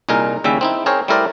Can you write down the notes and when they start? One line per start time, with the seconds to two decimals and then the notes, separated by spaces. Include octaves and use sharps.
0.09 C2 A#2 D#4 G#4 A#4
0.44 D#2 C#3 G3 C#4 E4 E5
0.61 C4 D#4 E4
0.86 C4 G#4 A#4 C5 C#5
1.08 G3 A3 E4 A#4 C5 D5